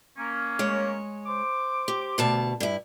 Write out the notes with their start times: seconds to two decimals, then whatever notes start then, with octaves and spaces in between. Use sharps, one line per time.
0.18 A#3 C#4
0.59 G#3 C#5
1.27 C5 D6
1.88 G4
2.18 D2 B2 A5
2.60 G2 E4